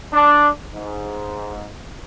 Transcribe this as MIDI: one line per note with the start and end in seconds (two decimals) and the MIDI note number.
0.12 0.49 62
0.72 1.69 44